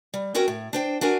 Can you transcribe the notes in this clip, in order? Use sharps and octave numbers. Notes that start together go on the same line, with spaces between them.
G3
C4 C#4 F#4 A#4 G5 G#5
A2
D4 C5 G5
D4 F#4 A#4 G#5